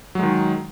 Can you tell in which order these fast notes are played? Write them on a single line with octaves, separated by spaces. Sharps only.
F#3 G#3 D#3